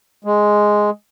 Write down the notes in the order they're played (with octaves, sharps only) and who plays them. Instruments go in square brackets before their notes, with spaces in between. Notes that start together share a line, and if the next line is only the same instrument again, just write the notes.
[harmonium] G#3